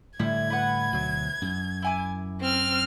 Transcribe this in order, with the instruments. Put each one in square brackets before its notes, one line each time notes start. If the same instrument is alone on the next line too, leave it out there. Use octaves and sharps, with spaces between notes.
[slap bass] A2 D3 G3 [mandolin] E4 [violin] G#6
[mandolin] E4 B4 F#5
[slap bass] D2 B2 F#3
F#2
[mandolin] E4 G#5 D6
[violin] C4 F6